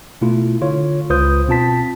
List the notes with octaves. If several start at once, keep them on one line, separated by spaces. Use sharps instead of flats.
B2 A3 E4 F4
D3 F4 C#5
C#2 F4 B4 C5 D#6 G6
B2 C4 F4 A5 B6